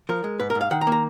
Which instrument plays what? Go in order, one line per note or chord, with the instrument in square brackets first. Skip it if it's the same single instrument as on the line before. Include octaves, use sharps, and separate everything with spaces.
[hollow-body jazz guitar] F3 A#4
G#3
G#2 B4
A#4
G#2
F5
D#3 F#5
A#5
A#3
A#5